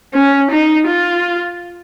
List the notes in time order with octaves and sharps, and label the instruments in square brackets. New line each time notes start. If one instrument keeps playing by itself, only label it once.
[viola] C#4
D#4
F4